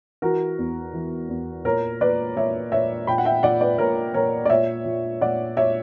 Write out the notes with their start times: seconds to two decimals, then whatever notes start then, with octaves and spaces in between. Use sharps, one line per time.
0.22 E3 F#4 A#4
0.58 E2
0.94 E3
1.29 E2
1.65 A#2 A#4 C#5
2.01 A#2 B4 D5
2.36 A#2 C#5 E5
2.72 A#2 C#5 E5
3.07 A#2 G5 B5
3.18 F#5
3.25 E5 G5
3.43 A#2 D5 F#5
3.61 B4 D5
3.78 A#2 A#4 C#5
4.14 A#2 A#4 C#5
4.45 D5
4.50 A#2 C#5 E5
4.85 A#2
5.21 A#2 D5 F#5
5.57 A#2 C#5 E5